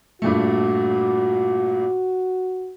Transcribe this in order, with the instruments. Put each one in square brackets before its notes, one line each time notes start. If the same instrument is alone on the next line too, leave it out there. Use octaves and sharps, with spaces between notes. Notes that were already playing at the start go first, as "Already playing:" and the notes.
[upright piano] G2 A#2 A3 [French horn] F#4